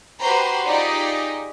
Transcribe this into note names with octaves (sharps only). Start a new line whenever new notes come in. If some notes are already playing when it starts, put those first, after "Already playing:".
F#4 G4 B4 C5 A#5 C6
D#4 F4 G4 G#4 D5 D#5